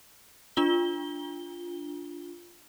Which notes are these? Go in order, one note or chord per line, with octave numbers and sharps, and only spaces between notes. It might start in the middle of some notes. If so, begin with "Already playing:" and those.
D4 F4 G7